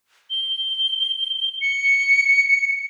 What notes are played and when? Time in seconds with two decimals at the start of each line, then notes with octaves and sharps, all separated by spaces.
0.30 G7
1.62 C#7